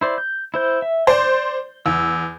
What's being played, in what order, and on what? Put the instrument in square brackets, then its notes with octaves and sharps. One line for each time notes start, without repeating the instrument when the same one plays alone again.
[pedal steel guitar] E4 C5 D5
G6
E4 C5 G6
E5
[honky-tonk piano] C5 D5 [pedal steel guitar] G6
[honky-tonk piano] E2 [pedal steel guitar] E6